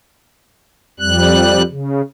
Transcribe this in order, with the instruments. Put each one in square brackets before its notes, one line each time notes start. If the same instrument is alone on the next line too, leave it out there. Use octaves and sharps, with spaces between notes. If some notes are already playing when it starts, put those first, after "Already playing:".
[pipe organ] F2 G3 F#6
C#3